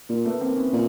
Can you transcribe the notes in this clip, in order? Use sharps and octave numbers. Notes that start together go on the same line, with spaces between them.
A#2 A#3
A3 B3
A#3 C4
B3 C#4
A#2